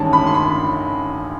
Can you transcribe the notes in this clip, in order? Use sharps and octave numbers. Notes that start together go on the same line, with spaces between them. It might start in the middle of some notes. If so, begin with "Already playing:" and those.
Already playing: A1 G2 D#3 G#3 C#4 A5
B5
C6
B5